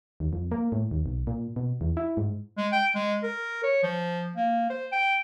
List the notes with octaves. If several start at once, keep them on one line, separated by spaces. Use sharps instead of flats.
D#2
F2
A#3
A2
D#2
B1
A#2
B2
E2
E4
G#2
G#3
G5
G#3
A#4
C#5
F3
A#3
C5
G5